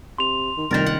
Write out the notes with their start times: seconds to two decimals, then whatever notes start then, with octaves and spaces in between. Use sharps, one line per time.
0.18 C3 C6 F7
0.57 D#3
0.71 F1 C2 D#3 A#4 A6
0.86 D#1 F#5